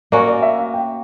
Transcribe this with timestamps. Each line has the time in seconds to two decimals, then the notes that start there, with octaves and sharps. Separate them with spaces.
0.12 A#3 C#4 F#4 D5
0.28 D5
0.42 E5
0.59 F5
0.74 G5